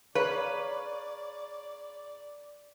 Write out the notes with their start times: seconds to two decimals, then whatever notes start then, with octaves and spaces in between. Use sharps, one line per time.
0.15 G#4 B4 C#5 D5 F5 A#5